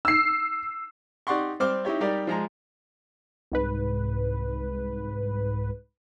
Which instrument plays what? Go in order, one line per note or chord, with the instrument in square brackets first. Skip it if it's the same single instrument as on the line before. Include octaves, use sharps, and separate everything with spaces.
[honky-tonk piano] E6 C7
[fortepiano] D#4 G4 D5 F#5 C6 C#6
G3 C4 C5 D6 F6
D#4 E4 G4 C#5
G3 D#4 G4 A#4 D5
F3 G#3 A#5
[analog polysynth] C2 G#2 B4